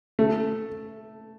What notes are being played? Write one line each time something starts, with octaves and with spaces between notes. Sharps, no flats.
A3